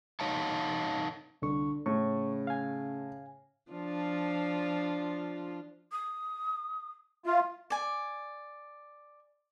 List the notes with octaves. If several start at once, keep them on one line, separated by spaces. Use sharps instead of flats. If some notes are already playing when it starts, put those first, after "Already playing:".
D#4 C#5 F5 F#5 A5
C2 D3 C#6
A2 C#3 C#6
F5 G#5
F3 D4 F4
D#6
F4 E5
D5 G#5